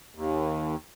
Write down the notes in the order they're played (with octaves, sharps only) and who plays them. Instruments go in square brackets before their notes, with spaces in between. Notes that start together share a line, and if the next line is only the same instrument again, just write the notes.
[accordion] D#2